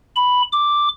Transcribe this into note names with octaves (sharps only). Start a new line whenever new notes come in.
B5
D6